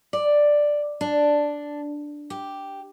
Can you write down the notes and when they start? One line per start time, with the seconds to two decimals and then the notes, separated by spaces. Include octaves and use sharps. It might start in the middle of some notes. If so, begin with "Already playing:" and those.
0.13 D5
1.01 D4
2.30 G4